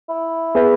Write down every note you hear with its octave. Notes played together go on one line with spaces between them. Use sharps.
E4
B3 G#4 B4 E5